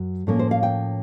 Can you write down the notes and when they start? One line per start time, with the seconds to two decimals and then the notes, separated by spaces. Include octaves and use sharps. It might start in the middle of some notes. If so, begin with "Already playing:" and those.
Already playing: F#2 F#3
0.27 A2 F3 A#3 C#4 C#5
0.39 C5
0.51 F5
0.63 G5